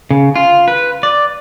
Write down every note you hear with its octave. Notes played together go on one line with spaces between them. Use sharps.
C#3
F4
B4
D5